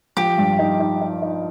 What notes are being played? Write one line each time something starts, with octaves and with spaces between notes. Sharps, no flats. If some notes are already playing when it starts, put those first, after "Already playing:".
F3 G4
G2
D#4
D#4
D#4
D#4